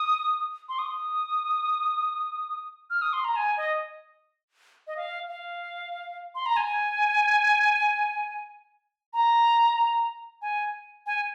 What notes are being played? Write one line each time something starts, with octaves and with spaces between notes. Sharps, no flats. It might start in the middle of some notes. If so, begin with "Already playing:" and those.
Already playing: D#6
C6
D#6
F6
D#6
C6
A#5
G#5
D#5
D#5
F5
F5
C6
A#5
G#5
A#5
G#5
G#5